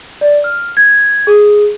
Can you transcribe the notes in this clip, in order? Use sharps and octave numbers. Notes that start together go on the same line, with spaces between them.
D5
F6
G#6
G#4